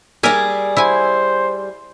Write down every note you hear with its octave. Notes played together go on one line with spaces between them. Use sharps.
G3 G#4 A#4 E5 G#5
E4 C5 G#5